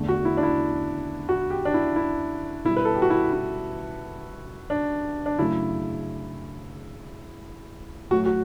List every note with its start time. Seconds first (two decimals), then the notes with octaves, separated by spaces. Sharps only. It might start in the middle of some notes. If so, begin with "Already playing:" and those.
Already playing: E2 D3 A3
0.09 F#4
0.25 E4
0.37 D4
0.43 E4
1.29 F#4
1.50 G4
1.65 D4
1.74 E4
1.96 E4
2.64 B2 E4
2.69 G3
2.76 B4
2.85 A4
2.94 G4
3.02 F#4
3.10 E4
3.33 E4
4.70 D4
5.26 D4
5.38 F#2 C#3 F#3 A3 E4
8.11 A2 F#3 A3 F#4
8.26 F#4